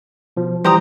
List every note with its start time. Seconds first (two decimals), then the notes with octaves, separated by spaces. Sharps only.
0.37 B2 F3
0.64 E3 G3 G4 C5 A#5 D#6